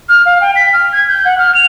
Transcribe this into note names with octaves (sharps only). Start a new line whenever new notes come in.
F6
F5
G5
B6
F6
G#6
G6
F#5
F6
F7